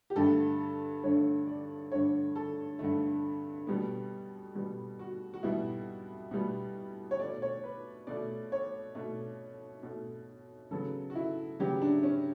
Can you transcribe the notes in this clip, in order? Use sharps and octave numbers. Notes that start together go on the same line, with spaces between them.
G4
G2 D3 A3 A4
G2 D3 A3 C#5
D5
G2 D3 A3 C#5
A4
G2 D3 A3
B2 G3 B3
B2 G3 B3
F#4
F#4
B2 G3 B3 E4
B2 G3 B3
C#5
B2 A3 D5
C#5
B4
B2 A3 D5
C#5
B2 A3
B2 A3
C#3 F#3 B3 A4
F#4
E4
C#3 F#3 B3 G4
D4
C#4